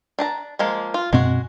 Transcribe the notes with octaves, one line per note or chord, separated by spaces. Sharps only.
D4 A5 A#5
F3 G#3 A#3
F4
F#2 B2 G#3 C4 F#4